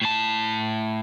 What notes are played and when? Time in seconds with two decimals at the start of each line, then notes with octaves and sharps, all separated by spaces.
0.02 A2 A5